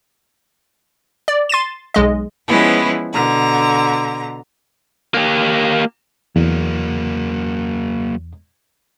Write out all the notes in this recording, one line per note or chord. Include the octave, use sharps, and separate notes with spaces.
D5
C6 A6 D#7 E7
B1 G#3 D#5
E3 F3 G#3 B3 C#4 E4
B2 D3 A#5
A#3 G4
E2 F#3 A#3